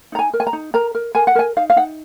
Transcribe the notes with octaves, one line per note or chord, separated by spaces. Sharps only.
D#4 A#5
G#5
A#4
G#5
A#5
D#4
A#4 A#5
A#4
A#4 G#5
F#5
A#4 G#5
D#4 F5
F5
D#4 F#5